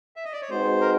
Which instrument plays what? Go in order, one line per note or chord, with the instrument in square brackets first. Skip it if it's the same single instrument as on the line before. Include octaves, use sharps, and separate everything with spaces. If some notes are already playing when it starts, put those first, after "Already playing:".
[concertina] E5
D#5
D5
C#5
[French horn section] G#3 C4 D#4 F#4 B4 [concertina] C5
[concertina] A#4